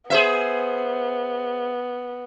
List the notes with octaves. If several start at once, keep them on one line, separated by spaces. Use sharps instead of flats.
B3 G#4 C5 E5